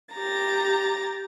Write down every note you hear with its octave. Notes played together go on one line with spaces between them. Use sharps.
G4 A#5 A6